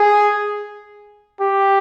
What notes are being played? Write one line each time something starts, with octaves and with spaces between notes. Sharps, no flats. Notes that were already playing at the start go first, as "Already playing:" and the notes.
Already playing: G#4
G4